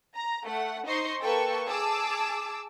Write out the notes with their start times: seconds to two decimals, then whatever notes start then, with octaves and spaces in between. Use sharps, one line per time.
0.16 A#5
0.45 A3 F#5
0.87 D#4 C5 D#5 C6 C#6 C7
1.22 A#3 A4 B4 G5 A5 C#6
1.69 G#4 A5 D6 E6